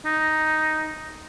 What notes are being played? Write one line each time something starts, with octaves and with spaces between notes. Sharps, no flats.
D#4